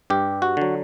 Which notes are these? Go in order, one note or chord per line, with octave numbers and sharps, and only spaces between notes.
G2 G4
F#4
D3 F#3